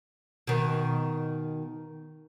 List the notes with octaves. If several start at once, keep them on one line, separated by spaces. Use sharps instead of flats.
B2 D#3